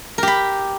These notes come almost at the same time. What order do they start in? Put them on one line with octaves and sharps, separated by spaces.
A#4 G4 B5